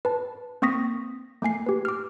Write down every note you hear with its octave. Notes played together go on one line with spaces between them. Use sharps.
B4 A5
A#3 C4 C#6 D#6 A#6 B6
A3 A#3 G#5 C7
G4 B4
D6 F6